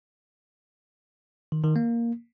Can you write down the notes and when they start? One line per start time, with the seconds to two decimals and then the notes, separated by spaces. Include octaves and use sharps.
1.52 D#3
1.64 D#3
1.76 A#3